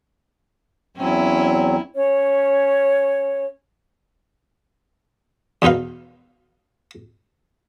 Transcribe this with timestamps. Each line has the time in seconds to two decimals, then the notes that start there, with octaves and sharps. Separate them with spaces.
0.97 E2 F#3 C4 C#4 E4
1.95 C#4 C#5
5.62 E2 B2 D#4 B4 F5